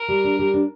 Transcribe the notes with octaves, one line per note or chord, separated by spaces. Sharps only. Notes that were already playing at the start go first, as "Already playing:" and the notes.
Already playing: A#4
G3
D4
G3
D4